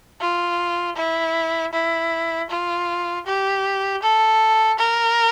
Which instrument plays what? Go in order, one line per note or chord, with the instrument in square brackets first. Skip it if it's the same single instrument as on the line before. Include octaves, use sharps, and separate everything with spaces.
[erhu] F4
E4
E4
F4
G4
A4
A#4